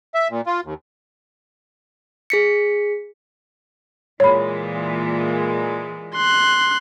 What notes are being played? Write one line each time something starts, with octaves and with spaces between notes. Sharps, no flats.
E5
A#2
F4
D#2
G#4 B6 C#7
A#2 E3 G#3 C#5 B5
C6 F#6